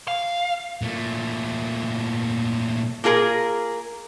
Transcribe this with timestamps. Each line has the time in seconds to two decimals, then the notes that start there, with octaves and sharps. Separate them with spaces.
0.08 F5
0.82 A#2 A3
3.04 A#3 F4 G#4 A#4